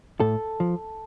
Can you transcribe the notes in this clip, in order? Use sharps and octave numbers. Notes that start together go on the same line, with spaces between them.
A2 A4
F3